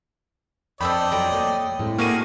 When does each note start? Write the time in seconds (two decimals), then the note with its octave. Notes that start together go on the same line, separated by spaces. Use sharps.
0.81 F2 C4 A4 D5 D#5 G5 B5
1.12 F3 F#3 A4 C#5 G5 A#5
1.32 A3 A#3
1.79 A2 G#3 C4
1.98 A3 A#3 F#4 G#4 A#4 D6 F6 D#7